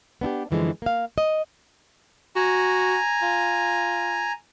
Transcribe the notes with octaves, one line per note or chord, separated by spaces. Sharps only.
B3 D4 E4 G4
F#2 D3 E3 F3 G#3
A#3 F5
D#5
F#4 G#5 A#5
F4